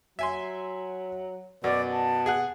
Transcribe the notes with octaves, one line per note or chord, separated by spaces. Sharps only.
F#3 E5 G#5 C6
F#2 B2 D5
A5
G#4 F#5 F#6